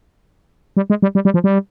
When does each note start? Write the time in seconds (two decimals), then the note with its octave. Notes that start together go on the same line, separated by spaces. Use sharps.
0.77 G3
0.90 G#3
1.02 G3
1.15 G3
1.25 G3
1.34 F3
1.44 G3